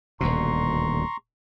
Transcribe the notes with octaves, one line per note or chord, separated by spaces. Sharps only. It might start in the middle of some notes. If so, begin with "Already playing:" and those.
D#1 D2 B2 A#5 C6 C#6